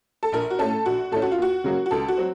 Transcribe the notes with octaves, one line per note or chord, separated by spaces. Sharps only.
A4
A#1 A#4
F#4
A2 A3 C#4 A4
A#1 F#4
A2 A3 C#4 A4
F#4
F4
D#2 F#4
C#3 F#3 A#3
F#4
C#2 A4
F#4
F#3 C4